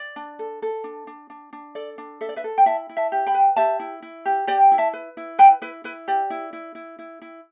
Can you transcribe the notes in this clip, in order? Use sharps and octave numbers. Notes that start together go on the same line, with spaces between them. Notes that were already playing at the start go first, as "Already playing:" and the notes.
Already playing: D5
D4
A4
A4
D4
D4
D4
D4
A4 D5
D4
A4 E5
D5
B4 E5
A4
G5
E4 E5 A5
E4
E5 A5
G4
G5 B5
B4
G4 E5 A5
E4
E4
G4
G4 D5 G5
E4
E5 A5
B4
E4
B4 G5 B5
E4 B4
E4 B4
G4 D5
E4
E4
E4
E4
E4